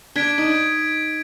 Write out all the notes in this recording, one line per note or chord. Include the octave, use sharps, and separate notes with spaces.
D4 G#6 B6 D7
D#4